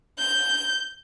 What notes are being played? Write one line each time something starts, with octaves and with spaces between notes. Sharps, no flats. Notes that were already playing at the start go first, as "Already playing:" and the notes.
G6